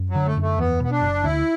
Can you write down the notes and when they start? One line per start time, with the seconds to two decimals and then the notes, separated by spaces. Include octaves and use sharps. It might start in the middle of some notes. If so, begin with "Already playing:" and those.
Already playing: F#2
0.10 F#3
0.15 D3
0.26 A3
0.37 F#2 A3
0.58 E2 B3
0.80 B2 B3
0.91 D4
1.01 F#1
1.23 D2 E4